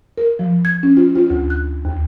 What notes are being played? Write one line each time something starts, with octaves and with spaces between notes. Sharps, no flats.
A#4
F3
G#6
C#4
F4
F4
D2
F#6
D#2